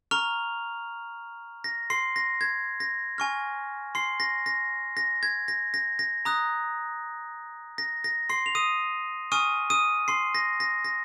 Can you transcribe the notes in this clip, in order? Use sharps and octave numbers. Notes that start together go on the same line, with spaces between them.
A#5 C#6 F6 F7
A#6
C6 C7
A#6
G#6
A#6
G#5 C#6 F6
C6 C7
A#6
A#6
A#6
G#6
A#6
A#6
A#6
A#5 D#6 F#6
A#6
A#6
C6 C7
F7
D#6 D#7
G#5 C#6 D#6 F6 D#7
D#6 D#7
C6 C7
A#6
A#6
A#6